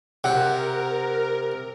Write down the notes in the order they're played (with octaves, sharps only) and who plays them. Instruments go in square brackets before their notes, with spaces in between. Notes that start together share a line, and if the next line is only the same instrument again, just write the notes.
[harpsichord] C3 [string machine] A#4 [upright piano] F#5